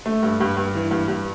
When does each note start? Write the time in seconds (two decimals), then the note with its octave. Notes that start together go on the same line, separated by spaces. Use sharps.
0.06 A3
0.23 G2
0.40 G2
0.57 G2
0.75 E3
0.91 G2
1.08 G2